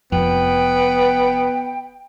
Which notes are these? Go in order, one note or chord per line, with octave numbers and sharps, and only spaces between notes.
F1 F2 B3 G5